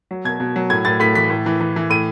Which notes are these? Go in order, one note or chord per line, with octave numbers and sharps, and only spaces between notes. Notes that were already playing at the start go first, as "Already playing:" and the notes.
F#3
B2 G#6
B2
F#3
A2 G#6
A2 A6
A2 B6
E3 B6
A2
E3
E3
E3
A2 D#7